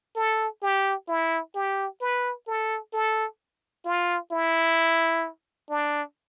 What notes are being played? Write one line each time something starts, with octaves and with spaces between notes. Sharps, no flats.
A4
G4
E4
G4
B4
A4
A4
F4
E4
D4